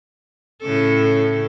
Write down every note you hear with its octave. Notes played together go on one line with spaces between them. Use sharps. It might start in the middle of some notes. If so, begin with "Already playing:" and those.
A2 C#3 A4